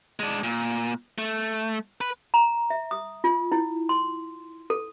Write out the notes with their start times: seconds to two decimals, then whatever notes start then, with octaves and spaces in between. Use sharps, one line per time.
0.20 G#3 D4
0.44 A#2
1.18 A3
2.01 B4
2.34 A#5
2.70 E5
2.91 D#6
3.24 F4
3.52 E4
3.89 C6
4.70 A4